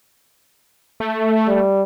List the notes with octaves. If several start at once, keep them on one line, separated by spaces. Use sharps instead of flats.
A3
G3